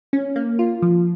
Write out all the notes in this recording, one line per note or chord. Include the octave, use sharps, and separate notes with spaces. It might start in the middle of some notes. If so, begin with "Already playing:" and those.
C#4
A#3
F4
F3